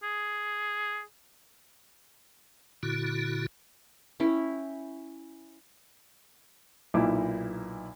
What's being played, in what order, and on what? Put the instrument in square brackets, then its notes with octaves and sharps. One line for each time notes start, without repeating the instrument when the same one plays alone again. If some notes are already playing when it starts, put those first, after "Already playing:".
[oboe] G#4
[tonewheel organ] A#2 D3 E4 F#4
[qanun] C#4 E4 G5
[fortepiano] B1 A#2 D#4 E4 D6